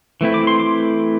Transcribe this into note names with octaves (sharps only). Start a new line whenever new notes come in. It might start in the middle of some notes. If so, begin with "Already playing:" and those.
E3 A3 C4 E4
D6
C6
D6